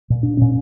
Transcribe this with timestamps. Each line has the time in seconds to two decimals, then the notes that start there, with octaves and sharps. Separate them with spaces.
0.10 A#2
0.23 D4
0.37 A#2 C#4